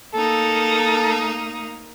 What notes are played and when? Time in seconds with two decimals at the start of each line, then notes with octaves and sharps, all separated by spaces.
0.14 A#3 D#4 A4